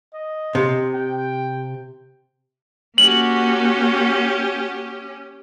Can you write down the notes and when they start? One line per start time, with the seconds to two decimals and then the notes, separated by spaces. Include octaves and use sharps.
0.14 D#5
0.55 C3
0.94 G5
2.98 A#3 C#4 F#4 G4 F#7